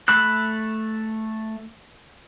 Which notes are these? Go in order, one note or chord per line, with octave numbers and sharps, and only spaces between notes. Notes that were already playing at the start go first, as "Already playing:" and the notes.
A3 B5 E6 F#6